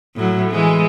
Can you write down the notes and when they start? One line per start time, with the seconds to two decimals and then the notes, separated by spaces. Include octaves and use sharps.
0.16 A2 F#3
0.52 E3 G#3